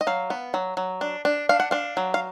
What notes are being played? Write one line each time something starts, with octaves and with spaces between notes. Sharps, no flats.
D#5
F#3 F5
B3
F#3
F#3
D4
D4
D4 F5
F#5
D4 F5
F#3
F5